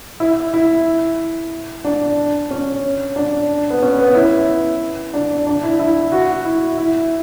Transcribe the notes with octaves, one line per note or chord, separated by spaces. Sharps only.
E4
E4
D4
C#4
D4
B3
C#4
B3
E4
D4
D4
E4
E4
F#4
E4
E4